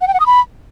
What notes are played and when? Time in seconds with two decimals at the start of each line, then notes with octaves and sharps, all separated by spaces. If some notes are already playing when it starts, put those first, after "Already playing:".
0.01 F#5
0.08 G5
0.14 F#5
0.20 D#6
0.26 B5